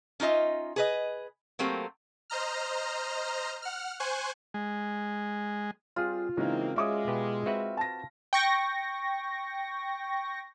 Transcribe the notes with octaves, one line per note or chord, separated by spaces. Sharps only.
C#4 D#4 F4 D#5 E5
G#4 B4 D#5
F#3 A3 A#3 C4 G4
C5 D#5 A#5 F6
F#5 F6
C5 G#5 C#6 F#6
G#3
G3 C4 F4 G#4
C#3 E3 G#3 A#3 C4 D#4
G#3 C#4 F#4 D5 E5 D6 D#6
B2 G4 B4
C4 F#4 B4 E5
A5 A#6
G5 C#6 A#6